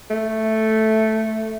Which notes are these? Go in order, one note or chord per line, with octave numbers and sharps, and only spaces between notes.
A3